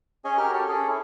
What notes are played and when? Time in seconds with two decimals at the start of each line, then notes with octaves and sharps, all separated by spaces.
0.25 C#4 G#4 C#5 D#5 G#5
0.37 F#4 G4 A#4 F6
0.53 G4 A4 C#5
0.68 C#4 G#4 A4
0.88 E4